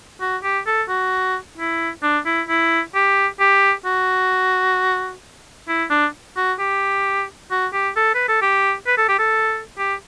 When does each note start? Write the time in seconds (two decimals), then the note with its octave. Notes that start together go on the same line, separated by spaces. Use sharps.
0.21 F#4
0.43 G4
0.67 A4
0.89 F#4
1.58 E4
2.03 D4
2.26 E4
2.49 E4
2.95 G4
3.40 G4
3.85 F#4
5.68 E4
5.90 D4
6.37 F#4
6.59 G4
7.51 F#4
7.73 G4
7.96 A4
8.15 B4
8.28 A4
8.42 G4
8.87 B4
8.98 A4
9.08 G4
9.19 A4
9.78 G4